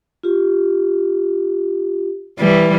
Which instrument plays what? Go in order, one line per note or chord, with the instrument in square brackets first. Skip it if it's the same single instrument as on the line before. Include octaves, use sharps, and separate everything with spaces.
[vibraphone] F4 G4
[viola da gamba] E3 G3